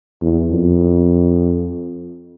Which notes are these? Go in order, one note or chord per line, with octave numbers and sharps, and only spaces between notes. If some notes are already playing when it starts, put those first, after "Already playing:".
E2
F2